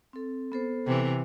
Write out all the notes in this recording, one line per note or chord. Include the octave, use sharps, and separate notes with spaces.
C4 A4
B3 A4 C5
C3 E3